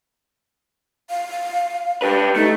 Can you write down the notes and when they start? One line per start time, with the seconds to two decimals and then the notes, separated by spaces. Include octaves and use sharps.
1.10 F5
2.02 D4 G4 B4
2.36 A3 D#4